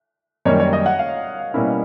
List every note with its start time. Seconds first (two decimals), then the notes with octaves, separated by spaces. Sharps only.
0.45 F#2 D#3 G3 A#3 C#5
0.60 C#5
0.73 D#5
0.86 F#5
0.99 F5
1.54 B2 G3 A#3 C#4 E4